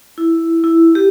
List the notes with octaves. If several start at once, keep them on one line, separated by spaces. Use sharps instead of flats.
E4
E4
G4